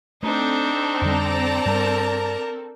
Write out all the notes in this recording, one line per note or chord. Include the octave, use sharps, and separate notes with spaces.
A3 C4 D4 D#4 A4
F2 D3 G3 D5 A5 A#5
G2 G3 A#4